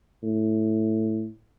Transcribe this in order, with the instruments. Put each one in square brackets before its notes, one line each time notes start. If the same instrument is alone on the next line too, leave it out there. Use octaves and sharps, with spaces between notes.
[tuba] A2